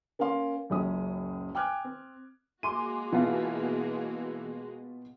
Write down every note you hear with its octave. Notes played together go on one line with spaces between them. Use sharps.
A#3 C#4 A#4 F5 C6
F#1 C#2 F#2 C#4 D#6
G5 G#5 D6 F6 F#6 G#6
C4
G#3 A#3 F#4 G#5 C6 D6 D#7
B2 E3 B3 F4